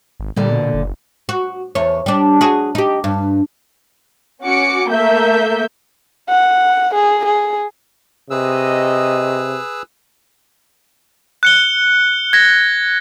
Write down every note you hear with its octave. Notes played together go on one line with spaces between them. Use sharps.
G#1
A#2 D3 G3
B2
F#1
F#4
E2 C#5
G3 D4
F#4 G#4
D#4 G4
G2
C#4 F#4 D6 C#7
A3 A#3 E5 G6
F#5
G#4
G#4
C3 G#4 B4 D#5 E6
F#6 C#7 G7
G#6 A#6